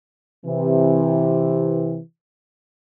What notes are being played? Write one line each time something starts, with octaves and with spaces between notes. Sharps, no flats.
C3 E3